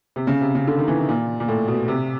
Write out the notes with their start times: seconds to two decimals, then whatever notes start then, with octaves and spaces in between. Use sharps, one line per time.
0.16 C3
0.27 C#3
0.41 C3
0.55 C#3
0.68 D3
0.78 D#3
0.88 E3
0.98 D#3
1.09 A#2
1.40 A#2
1.48 A2
1.68 B2
1.88 C3